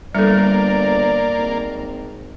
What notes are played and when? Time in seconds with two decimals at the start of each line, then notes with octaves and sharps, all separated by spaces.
0.15 G1 G3 A#3 A4 D5
1.38 G#1